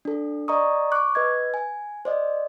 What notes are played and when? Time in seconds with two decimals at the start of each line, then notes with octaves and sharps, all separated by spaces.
0.05 D4 A4
0.48 D5 D#5 A#5 C#6 D#6
0.92 C#6 D6 F#6
1.15 B4 D#5 G#6
1.54 G#5
2.05 C5 D5 D#5